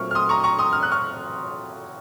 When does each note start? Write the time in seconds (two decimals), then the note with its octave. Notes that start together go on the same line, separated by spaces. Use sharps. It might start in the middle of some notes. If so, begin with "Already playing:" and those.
Already playing: A#2 F#3 A3 C4 C#6 F6
0.11 F6
0.15 C6 D#6
0.29 A#5 C#6
0.44 A#5 C#6
0.59 C6 D#6
0.73 F6
0.83 F#6
0.92 C#6 F6